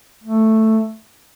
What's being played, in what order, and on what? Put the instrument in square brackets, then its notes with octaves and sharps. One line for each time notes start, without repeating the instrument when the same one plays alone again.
[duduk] A3